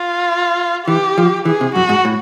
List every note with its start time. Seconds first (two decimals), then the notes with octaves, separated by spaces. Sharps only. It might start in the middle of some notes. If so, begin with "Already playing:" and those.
Already playing: F4
0.87 E3 G4
1.18 F3
1.45 E3 G#4
1.61 C3
1.75 F#2 F#4
1.89 G#2
2.05 A2